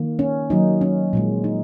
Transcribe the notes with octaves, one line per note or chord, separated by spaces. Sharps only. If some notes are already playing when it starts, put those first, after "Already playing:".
Already playing: D#3 A#3
C#4
D#3 F#3 A#3 D#4
C#4
A#2 F3 G#3
D#4